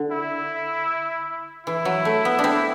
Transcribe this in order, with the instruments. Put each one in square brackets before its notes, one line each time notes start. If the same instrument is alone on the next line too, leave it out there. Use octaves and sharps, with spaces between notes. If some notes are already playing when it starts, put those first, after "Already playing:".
Already playing: [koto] D3
[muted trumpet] E4
[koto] E3 [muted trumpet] E4
[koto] F#3
A3
B3
D4
C4